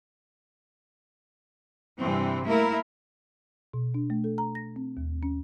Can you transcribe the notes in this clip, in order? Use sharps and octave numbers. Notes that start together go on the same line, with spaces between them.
G2 C3 E3 C4
A3 A#3 E4 A#4
B2
D4
A3
A4
A#5
A#6
C4
D#2
C#4